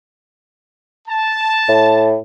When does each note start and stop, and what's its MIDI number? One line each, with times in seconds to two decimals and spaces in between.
1.08 2.09 81
1.69 2.17 45